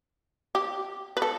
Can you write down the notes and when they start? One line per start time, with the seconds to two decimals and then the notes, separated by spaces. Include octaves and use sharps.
0.55 G4
1.17 B4
1.22 A4